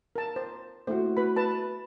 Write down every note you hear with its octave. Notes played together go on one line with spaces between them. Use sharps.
A#4 A5
C5
A3 E4 F#4 C5
B4 B5
B4 A5